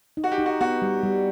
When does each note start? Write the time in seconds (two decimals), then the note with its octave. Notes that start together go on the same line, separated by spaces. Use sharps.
0.17 D#4
0.24 F#4
0.31 G4
0.38 D#4
0.46 F#4
0.61 B3 F#4
0.82 G3
1.03 G3